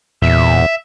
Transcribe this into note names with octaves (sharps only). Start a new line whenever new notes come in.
E2 A#2 E5